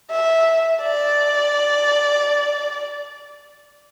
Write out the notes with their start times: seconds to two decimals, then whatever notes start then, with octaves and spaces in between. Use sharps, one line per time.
0.11 E5
0.83 D5